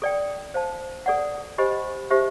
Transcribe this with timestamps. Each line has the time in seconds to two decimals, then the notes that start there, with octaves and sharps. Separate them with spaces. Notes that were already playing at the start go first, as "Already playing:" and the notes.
0.02 A4 D5 G5
0.54 C5 F5 A5
1.06 A4 D5 F#5
1.58 G4 C5 D#5 G#5 B5
2.11 D#4 G4 C5 E5